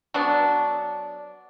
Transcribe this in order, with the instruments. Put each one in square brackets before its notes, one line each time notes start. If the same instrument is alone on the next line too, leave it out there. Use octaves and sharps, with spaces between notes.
[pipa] F#3 B3 D4